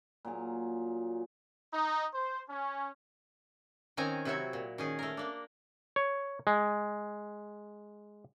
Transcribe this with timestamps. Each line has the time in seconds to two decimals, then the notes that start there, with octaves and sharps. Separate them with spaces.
0.25 A#2 F#3 G#4
1.72 D#4
2.14 C5
2.49 C#4
3.97 D#3 C4 C#4 G#5 A#5
4.25 C3 F#3 E4 F#4 C#5
4.53 A#2
4.78 D#3 C#4 G#4
4.99 A3 A#4
5.17 A#3 D4
5.96 C#5
6.47 G#3